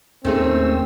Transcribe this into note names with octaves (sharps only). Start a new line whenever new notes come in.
D#2 D#3 A3 C4 C#4 G#4 E6